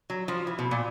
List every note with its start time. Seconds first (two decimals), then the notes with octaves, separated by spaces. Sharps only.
0.10 F#3
0.28 F3
0.47 E3
0.59 B2
0.71 A#2